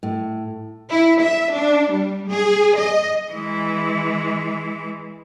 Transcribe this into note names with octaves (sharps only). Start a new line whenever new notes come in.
A2
E4
E5
D4
G3
G#4
D#5
E3 G#3